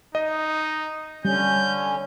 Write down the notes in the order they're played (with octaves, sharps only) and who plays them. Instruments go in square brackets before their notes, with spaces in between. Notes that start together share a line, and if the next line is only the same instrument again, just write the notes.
[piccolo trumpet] D#4 [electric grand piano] D#5
[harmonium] D3 C#4 [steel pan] G3 [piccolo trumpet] G6